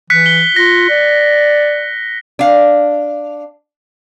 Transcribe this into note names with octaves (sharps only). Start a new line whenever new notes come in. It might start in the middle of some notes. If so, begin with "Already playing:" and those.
E3 F#6 B6 C#7
G7
F4 A#6
D5
D4 F5